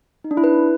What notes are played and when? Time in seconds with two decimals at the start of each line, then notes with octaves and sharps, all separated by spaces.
0.24 D#4
0.31 D4
0.37 E4
0.44 B4